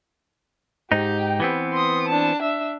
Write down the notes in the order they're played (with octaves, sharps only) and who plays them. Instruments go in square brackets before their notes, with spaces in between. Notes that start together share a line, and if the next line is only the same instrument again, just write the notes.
[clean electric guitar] G#2 D#4 [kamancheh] G4 G5
[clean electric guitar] E3 B3 C4
[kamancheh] C6 D#6
D4 A5
D4 E5